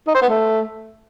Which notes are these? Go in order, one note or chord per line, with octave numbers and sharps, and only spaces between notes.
D#4
C5
B3
A3